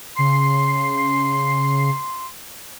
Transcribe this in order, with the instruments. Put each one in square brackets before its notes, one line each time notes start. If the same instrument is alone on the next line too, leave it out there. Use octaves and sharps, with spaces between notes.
[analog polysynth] C#3 C7 [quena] C6